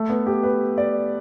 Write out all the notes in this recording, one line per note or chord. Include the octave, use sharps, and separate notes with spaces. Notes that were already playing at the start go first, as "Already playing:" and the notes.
Already playing: A3
B3
G4
B4
D5